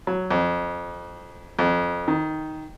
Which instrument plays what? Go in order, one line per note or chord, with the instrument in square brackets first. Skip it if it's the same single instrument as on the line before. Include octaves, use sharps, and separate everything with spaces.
[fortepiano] F#3
F2
F2
D#3